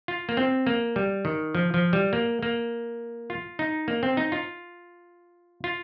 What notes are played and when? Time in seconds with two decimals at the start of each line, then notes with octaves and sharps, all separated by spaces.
0.08 F4
0.29 A#3
0.37 C4
0.67 A#3
0.96 G3
1.25 D#3
1.55 F3
1.74 F3
1.93 G3
2.13 A#3
2.43 A#3
3.30 F4
3.59 D#4
3.88 A#3
4.03 C4
4.17 D#4
4.32 F4
5.64 F4